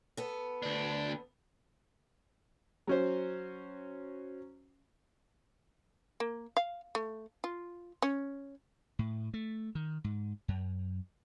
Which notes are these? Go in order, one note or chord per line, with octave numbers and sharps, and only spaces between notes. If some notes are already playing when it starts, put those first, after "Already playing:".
B3 A4
D2 D4
F#3 C#4 C5
A#3
F5
A3
F4
C#4
A2
A3
D#3
G#2
F#2